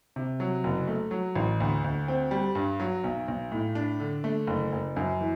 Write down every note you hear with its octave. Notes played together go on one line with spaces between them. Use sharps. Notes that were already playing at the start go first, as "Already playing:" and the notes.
C3
F#3
F#1
A3
F#3
A1
D2
D2
C4
G3
G2
F#3
B1
B1
A2
D4
D3
A3
F#1
F#1
F#2
E3